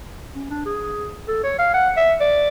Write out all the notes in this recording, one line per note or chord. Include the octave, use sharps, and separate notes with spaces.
C#4
D4
G#4
A4
C#5
F5
F#5
E5
D5